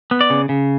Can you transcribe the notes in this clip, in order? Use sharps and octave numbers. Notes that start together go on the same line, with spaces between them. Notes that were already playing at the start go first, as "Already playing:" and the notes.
B3
D5
C#3
C#3